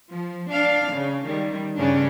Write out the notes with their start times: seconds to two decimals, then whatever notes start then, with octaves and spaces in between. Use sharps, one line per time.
0.10 F3
0.51 D4 F5
0.93 C#3
1.25 D#3 G3
1.78 G2 C#3 C#4 D4